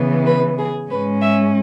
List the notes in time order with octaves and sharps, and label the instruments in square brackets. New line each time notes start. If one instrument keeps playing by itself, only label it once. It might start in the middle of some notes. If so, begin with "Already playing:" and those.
Already playing: [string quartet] C#3 E3 B3
B4
G#4
G#2 G#3 C#4 B4
E5